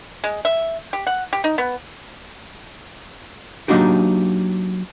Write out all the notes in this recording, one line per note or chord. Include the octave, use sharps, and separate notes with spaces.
G#3
E5
G4
F#5
G4
D#4
B3
F#3 A#3 D4 D#4 F#4 G4